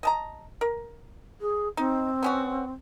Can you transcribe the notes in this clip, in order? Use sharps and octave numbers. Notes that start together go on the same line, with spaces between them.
D#5 A5 A#5
A#4
G#4
C4 D#4
B3 C#4 F#4